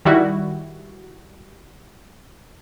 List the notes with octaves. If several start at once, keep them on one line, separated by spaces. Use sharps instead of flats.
D#3 G3 E4 F#4